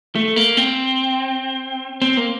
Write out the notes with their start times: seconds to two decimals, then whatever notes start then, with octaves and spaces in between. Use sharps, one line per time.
0.15 A3
0.36 A#3
0.57 C4
2.02 C4
2.17 A#3